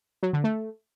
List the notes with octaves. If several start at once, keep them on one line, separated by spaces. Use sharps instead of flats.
F#3
D3
A3